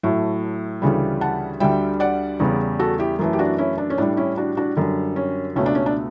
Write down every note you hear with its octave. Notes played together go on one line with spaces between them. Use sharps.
A2 F#3 A3
D2 C#3 E3 G3
F#5 A5
D2 D3 G3 E5 G5
D5 F#5
E2 C#3 G3
F#4 A4
E4 G4
F#2 E3 A3
G4
D4 F#4
C#4 E4
D4
C#4
A2 G3 D4
C#4 E4
D4 F#4
D4 F#4
F#2 D3 G3
C#4
C#2 B2 A3 C#4
D4
C#4
D4